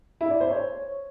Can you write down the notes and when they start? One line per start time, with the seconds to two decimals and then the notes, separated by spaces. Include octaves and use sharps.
0.21 E4
0.31 D5
0.41 C5
0.50 C#5